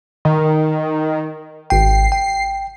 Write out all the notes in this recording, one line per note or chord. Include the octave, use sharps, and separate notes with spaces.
D#3
G#1 G5 C7
G5